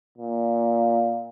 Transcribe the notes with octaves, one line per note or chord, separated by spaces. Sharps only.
A#2